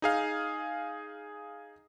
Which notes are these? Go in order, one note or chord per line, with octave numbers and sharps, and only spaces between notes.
D#4 G#4 F5